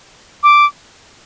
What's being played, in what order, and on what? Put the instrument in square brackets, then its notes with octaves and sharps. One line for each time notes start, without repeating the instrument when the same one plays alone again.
[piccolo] D6